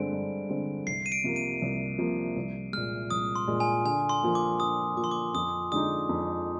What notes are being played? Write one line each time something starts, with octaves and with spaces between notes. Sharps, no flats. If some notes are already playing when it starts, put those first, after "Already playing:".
Already playing: G2 D3 G#3 C4 D7
G2
D3 G#3 C4
C2 C7
D#7
D7
C3 F3 A#3
D#7
C2
C3 F3 A#3
C2
A#2 G#3 F6
C2 D#6
C6
A#2 G#3
G#5
D3 G#5
C6
F3 A#3 F4
D6
D3 D#6
F3 A#3 F4 D6
C6
D6
F2 D#6
D3 G#3 D#4 D#6
F2